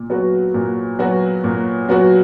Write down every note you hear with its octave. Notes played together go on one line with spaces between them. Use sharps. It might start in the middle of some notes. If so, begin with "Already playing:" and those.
Already playing: A#2
F#3 B3 F#4
A#2
F#3 B3 F#4
A#2
F#3 B3 F#4